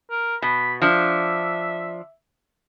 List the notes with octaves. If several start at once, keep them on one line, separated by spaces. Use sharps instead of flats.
A#4
B2 B5
F3 D4 E5